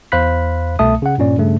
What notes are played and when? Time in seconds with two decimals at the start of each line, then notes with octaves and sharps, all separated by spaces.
0.12 E2 C5 F5 B5 F#6 B6
0.79 C2 B2 A3 E5 A5 D#6
1.02 C#3 F#5
1.18 G2 A#2 C#4 D5
1.38 G2 C#3 A3